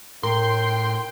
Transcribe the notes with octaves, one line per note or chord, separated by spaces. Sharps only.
A2 A#4 G5 C6 G6